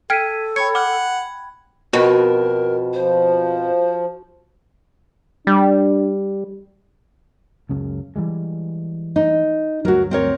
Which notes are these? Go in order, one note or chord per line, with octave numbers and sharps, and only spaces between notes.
A4 G5 F6 G#6 B6 D7 D#7
C#5 G5 B5 G#6 C#7
F#5 D6 F6
F2 B2 F#4 A#4
F3 C5
G3 D4
C#2 F#2 C#3
E3 G3 G#3
D#4
D2 G2 F#3 F#4 A#4
C4 A#4 C#5